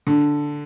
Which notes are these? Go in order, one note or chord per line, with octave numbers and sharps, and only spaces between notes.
D3